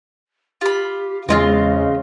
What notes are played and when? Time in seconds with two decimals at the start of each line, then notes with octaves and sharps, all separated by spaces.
0.61 F4 G4 B5
1.29 E2 C#3 G#3 C4 D#4 F4 D#5